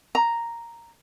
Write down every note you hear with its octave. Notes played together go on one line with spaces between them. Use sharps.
A#5